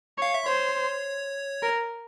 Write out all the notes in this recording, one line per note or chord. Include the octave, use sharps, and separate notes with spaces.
C#5
F5
E5
C5 C#5
A#4